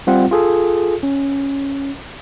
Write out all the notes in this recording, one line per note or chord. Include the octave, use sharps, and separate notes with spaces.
G3 C4 F4 F#5
F4 G#4 A4
C#4